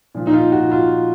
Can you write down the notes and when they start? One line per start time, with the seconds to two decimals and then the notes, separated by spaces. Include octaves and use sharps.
0.14 A#2 F3
0.27 D#4
0.34 F4
0.52 F#4
0.71 F4